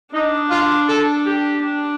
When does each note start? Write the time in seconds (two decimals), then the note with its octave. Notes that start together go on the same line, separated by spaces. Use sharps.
0.13 D4 D#4
0.50 F4
0.88 A4
1.25 G4
1.63 D4